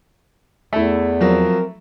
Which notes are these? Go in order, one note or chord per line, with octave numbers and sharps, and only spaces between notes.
E2 A3 E4
F3 F#3 C4 A#4